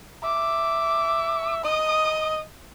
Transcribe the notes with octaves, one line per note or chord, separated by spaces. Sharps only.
E5 D6
D#5 D#6